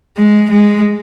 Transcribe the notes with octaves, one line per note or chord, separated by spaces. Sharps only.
G#3
G#3